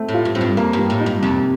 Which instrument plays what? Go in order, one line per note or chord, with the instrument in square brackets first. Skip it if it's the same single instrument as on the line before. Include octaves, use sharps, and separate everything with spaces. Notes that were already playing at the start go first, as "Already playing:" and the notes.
Already playing: [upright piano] A3 C4
[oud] A2
[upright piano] F4
[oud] G2
[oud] A2 [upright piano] C4
[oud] G2
[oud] F2 [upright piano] A#3
[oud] G2
[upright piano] G3
[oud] A2
[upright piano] D#4
[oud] G2
[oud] F2 [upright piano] C3